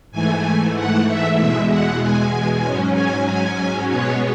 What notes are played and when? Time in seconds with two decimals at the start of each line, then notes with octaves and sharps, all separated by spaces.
0.11 G#2 E3 A3 G#5
0.75 F#5
1.07 E5
1.37 E2 B2 G#3 E5
1.70 F#5
2.01 G#5
2.64 G#2 F#3 C#4
2.95 G#5
3.27 G#5
3.90 B2 G#3 B3 C#5